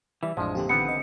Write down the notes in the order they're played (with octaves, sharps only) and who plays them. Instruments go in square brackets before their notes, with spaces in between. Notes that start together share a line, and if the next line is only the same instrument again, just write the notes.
[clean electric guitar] E3 G3 [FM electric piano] E5
[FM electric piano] A1 F2 D4 [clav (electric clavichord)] F3 [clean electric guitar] G#3
[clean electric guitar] F2 A#2 D3 [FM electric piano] F4 G4
[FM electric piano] A#1 D#3 [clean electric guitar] D3 C4 B4 [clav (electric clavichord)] B3 [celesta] C#7
[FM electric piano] D#5 D#6